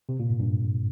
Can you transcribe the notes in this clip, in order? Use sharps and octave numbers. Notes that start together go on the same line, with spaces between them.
C3
A#2
G#2
G2